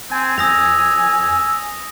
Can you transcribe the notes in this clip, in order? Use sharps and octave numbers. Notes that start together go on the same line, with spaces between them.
C4 G#5
F2 D#6 E6 A#6 F7